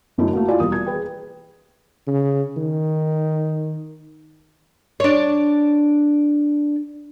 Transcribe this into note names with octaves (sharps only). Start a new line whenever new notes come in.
F#1 F#2 A3 D4 E4 C#5
A3 A#3 F#4
E4 F4 D5 F5 G#5
E1 G3 A#3 D#6
G#6
G#4 B4 G5
C#3
D#3
D4 C#5